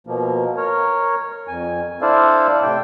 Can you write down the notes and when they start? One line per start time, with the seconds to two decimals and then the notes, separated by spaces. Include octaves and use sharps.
0.07 B2 F3 A#3
0.57 A#4 C#5
1.48 F2 G#5
2.02 D4 E4 A4 C5 D5 F5
2.62 A2 C3 G5